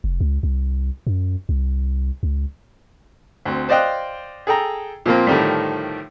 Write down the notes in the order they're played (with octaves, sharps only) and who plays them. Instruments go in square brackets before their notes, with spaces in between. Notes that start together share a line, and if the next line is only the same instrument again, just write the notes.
[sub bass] F1
C#2
C2
F#2
C2
C#2
[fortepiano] D2 C4
C5 D5 D#5 F5 G5 F#6
G#4 A4 G5 A#5
A#2 F3 A#3 C4
A2 D3 D#3 F3 G3